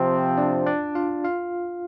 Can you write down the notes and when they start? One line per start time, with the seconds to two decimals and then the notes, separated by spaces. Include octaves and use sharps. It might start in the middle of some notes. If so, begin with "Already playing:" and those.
Already playing: C3 F3 C4 F4 F5
0.38 D4 D5
0.66 D4 D5
0.95 F4 F5
1.24 F4 F5